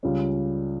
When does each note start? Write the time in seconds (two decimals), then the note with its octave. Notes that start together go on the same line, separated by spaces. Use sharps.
0.03 C#2 C#3 G3 C#4